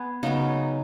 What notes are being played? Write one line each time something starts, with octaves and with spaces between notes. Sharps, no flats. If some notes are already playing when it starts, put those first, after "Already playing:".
Already playing: B3 G#4
C#3 F#3 B3 D#4